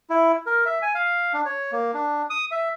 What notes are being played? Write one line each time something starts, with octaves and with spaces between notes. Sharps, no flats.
E4
A#4
E5
G#5
F5
D4
C#5
A#3
D4
D#6
E5